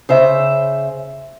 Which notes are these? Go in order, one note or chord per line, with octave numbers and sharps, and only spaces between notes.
C#3 C5 E5